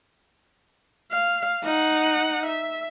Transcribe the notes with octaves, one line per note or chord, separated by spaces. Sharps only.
F5
D#4 F#5
E5